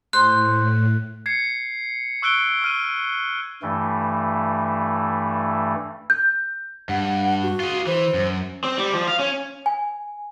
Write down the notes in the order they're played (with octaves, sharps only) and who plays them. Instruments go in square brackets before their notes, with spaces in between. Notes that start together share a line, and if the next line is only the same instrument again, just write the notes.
[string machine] A2 [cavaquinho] C5 [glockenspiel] F#6
[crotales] G#6 C7 C#7
C#6 E6 F#6 D7 G7
C#6 F6 D#7
[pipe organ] G2 E3 A3
[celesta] G6
[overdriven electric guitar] G2 [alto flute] F#5
[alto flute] F#4
[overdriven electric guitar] F4 G#4
[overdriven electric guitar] E3 [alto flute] C5
[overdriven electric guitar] F#2
C4
G3
F3
F5
C#4
[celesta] G#5